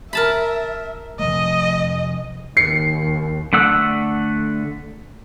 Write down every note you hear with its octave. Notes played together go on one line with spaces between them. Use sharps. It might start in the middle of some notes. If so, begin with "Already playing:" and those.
A#4 E5 A5 B5
C3 F3 A3 D#5
D#2 C7 C#7
D3 A3 F#5 E6